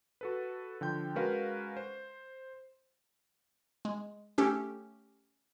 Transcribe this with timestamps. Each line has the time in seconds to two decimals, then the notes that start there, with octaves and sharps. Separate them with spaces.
0.21 F#4 A4 B4
0.81 D3 F3 G5 G6
1.15 G#3 C#4 F#4 A#4 B4 F5
1.77 C5
3.85 G#3
4.38 A3 C#4 G4 A4